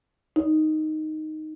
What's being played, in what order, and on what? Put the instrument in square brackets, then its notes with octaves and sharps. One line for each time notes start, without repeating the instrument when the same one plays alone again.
[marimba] D#4